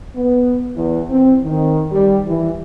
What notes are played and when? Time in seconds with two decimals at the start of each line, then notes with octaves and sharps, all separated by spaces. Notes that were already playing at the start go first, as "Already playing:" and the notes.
0.15 B3
0.75 E2
1.10 C4
1.44 D#3
1.91 G3
2.26 E3